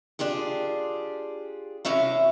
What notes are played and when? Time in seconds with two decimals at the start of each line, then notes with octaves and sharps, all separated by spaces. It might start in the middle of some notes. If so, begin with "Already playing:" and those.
0.19 D4 F4 G4 G#4
1.85 C3 E3 C#4 E5 F5